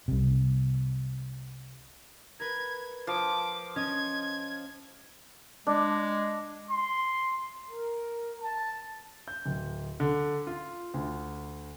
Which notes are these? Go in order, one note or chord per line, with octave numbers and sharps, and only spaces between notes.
C2 C3
A#4 B4 G#6
F3 D6
C#4 D#5 G#6
G#3 D4
C6
A#4
A5
G6
D1
D3
F4
D2